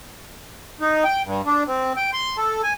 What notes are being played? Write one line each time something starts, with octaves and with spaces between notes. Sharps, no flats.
D#4
G5
G2
D4
C4
G5
C6
A4
G#5